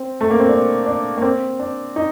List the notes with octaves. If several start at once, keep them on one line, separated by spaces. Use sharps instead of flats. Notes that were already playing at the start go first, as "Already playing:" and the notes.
Already playing: C4
A3
A#3
C4
D4
D4
A#3
C4
D4
D#4